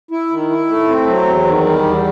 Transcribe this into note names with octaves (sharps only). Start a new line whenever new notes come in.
E4
D#3
E4
A3
C4
F#3
E2
D#3
G3
E2